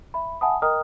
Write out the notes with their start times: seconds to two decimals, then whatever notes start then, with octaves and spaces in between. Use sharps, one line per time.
0.14 E5 B5
0.41 E5 F#5 G#5 A5 B5 D#6
0.62 A#4 D#5 G5 A#5 D#6 F6